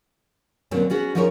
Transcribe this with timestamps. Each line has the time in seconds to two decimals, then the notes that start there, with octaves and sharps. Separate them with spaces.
0.71 B2 D3 F#3 A#3 C4 C#4
0.90 B3 C#4 F#4 G#4
1.15 F3 C#4 D#4 G#4 A#4 C#5